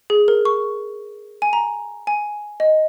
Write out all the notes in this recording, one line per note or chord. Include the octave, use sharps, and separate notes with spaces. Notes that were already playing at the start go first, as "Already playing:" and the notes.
G#4
A#4
C#6
G#5
A#5
G#5
D#5